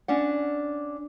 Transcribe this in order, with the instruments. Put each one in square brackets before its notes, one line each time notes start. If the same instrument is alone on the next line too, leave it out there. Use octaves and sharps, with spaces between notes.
[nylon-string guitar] C#4 D4 F#5